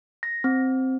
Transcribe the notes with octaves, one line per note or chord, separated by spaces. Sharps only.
A#6
C4